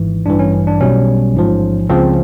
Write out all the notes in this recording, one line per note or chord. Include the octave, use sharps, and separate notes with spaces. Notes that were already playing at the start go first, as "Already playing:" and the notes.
Already playing: G#1 G#2 E3
A1 G2 E3 D4
C#4
D4
B1 B2 G3 C#4
A1 G#2 F3
C#2 C#3 F3 C4